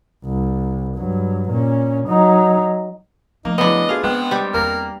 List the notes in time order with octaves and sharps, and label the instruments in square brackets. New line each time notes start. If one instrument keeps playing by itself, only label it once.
[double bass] C2
G2 F#3
A#2 C#4
F#3 D#4
[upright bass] F3 A3 [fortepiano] A#3 [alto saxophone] D#4
[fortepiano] F#2 C#3 E3 [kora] B3 D4 [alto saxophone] D#5
[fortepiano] A3 F4 G#4 [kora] F5
[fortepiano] G#1 G5 [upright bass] G#3 [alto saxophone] B3
[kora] G3 G4
[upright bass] E2 C4 [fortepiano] A#3 [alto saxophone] A#4